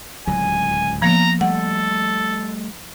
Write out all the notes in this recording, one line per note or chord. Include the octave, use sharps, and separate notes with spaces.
D1 C#2 F#3 G#5
F3 A#3 B3 A#5
G3 A3 A4 F#5